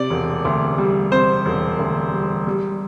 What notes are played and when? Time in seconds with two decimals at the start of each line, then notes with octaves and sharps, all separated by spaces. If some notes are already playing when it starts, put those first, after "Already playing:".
Already playing: C3 D5
0.10 E1
0.45 D2
0.78 G3
1.11 C3 C5
1.45 E1
1.79 D2
2.12 G3
2.47 G3